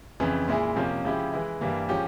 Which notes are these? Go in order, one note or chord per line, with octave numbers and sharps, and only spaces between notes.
F2 C#3 E3
A#2 G#3 E4 G#4
F2 C3 F3 A#3 C#4
C#3 F3 G#3 E4 G4
E3 G#3 E4
G2 E3 G3 A#3
F3 G#3 C#4 G4